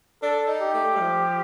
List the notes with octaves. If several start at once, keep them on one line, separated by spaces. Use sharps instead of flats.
D4 A4
D#4
G4
A3
G3
F3